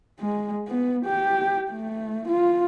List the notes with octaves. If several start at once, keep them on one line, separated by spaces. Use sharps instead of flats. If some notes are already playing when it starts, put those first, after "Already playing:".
G#3
B3
G4
A3
F4